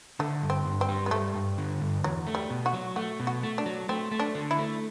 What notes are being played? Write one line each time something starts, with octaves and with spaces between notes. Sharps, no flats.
D3 A3
G2
C4
G2
C4
G3
B3
G2 A3
G2
D3
G2
E2 F#3
A3
G3
B2
F#4
F#3
A3 F#4
B2
F#4
A3
D4
F#3
A3 C4
A3
D4
D3
E4
A3